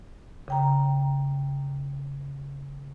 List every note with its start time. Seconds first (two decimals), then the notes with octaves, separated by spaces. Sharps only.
0.48 C#3 G5 A#5